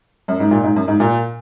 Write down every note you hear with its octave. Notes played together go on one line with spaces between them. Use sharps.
F#2
G#2
A#2
G#2
F#2
G#2
A#2